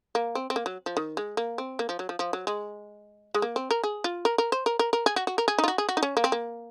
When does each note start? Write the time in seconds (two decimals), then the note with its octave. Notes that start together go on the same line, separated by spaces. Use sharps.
0.15 A#3
0.35 C4
0.50 C4
0.56 A#3
0.66 F#3
0.86 F3
0.97 D#3
1.17 G#3
1.37 A#3
1.58 C4
1.79 A#3
1.89 F3
1.99 F#3
2.09 F3
2.19 F3
2.33 F#3
2.47 G#3
3.34 G#3
3.42 A#3
3.56 C4
3.71 A#4
3.83 G#4
4.04 F4
4.25 A#4
4.38 A#4
4.52 C5
4.66 A#4
4.79 A#4
4.93 A#4
5.06 G#4
5.16 F#4
5.27 F#4
5.38 A#4
5.48 G#4
5.58 D#4
5.64 F4
5.68 F#4
5.78 G#4
5.89 F#4
5.97 D#4
6.03 C#4
6.17 A#3
6.24 C4
6.32 A#3